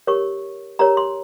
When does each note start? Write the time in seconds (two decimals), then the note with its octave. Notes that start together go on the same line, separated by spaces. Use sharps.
0.07 G4 A#4 C#5 C#6
0.79 G4 A#4 C#5 A#5
0.97 C6